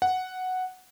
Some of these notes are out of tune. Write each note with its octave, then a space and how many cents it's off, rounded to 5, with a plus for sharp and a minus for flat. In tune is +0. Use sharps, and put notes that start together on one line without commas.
F#5 +0